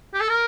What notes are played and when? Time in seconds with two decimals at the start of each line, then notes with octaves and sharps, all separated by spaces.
0.14 G4
0.21 A4
0.29 A#4